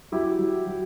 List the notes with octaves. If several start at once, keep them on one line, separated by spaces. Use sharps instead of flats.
F#3 E4 G4
F#3
F#3